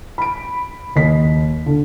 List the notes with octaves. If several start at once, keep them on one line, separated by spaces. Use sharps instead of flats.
B5 D7
D#2 D#5 B6
D3